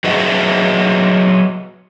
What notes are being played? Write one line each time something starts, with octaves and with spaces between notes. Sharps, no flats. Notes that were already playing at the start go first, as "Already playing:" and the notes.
F#3 G#4 B4 D#5 E5 F#5